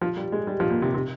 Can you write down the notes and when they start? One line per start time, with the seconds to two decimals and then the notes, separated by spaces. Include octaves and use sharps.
0.01 F3
0.17 G3
0.32 G#3
0.47 G3
0.60 F3
0.70 A#2
0.82 C3
0.94 C3